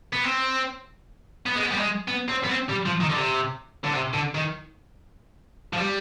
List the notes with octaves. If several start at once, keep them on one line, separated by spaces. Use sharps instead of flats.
B3
C4
B3
G#3
B3
G3
G#3
B3
C4
B3
C4
G3
F3
D#3
D3
C3
D3
C3
D3
D#3
F3
G3